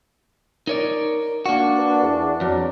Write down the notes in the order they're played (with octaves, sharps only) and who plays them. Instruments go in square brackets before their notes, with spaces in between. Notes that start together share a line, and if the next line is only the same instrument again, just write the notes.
[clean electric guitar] D#4 C#5 D5 [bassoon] A#4
[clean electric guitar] A#3 F#4 [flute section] D4
[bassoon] B4
E2
[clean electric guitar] F2 [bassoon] F#3